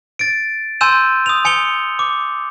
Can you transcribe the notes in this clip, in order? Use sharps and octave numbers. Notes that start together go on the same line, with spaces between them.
A6 D7
G#5 C6 E6 G6 D#7 E7
D#6 F7
G#5 C#7 F7 G7
D6